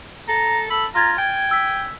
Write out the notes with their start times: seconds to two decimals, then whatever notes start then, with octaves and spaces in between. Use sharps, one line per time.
0.29 A4 A#5
0.70 A4 B5
0.95 F4 A#5 F6 G#6 A6
1.18 G5 G#5
1.51 E6 B6